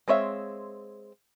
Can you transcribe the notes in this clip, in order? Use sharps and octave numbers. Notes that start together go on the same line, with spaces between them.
G#3 C4 C#5 E5 F5